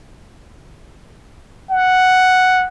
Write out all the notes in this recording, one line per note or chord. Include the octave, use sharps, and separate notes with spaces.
F#5